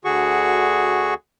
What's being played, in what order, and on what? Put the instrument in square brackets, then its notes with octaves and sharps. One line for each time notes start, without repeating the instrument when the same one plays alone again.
[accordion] D2 D3 F#4 G#4 C#6